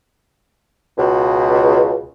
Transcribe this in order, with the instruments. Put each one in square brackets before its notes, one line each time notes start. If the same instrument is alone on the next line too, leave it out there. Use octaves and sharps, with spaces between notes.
[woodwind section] C#2 B2